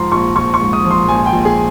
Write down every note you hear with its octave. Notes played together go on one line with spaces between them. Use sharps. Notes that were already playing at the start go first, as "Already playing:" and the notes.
Already playing: G#2 F3 A#5 C6
A#1 C#6
A#1 C#6
C#6
G#2
D#6
F3
C6
A#1 G#5
G5
A#1
G#4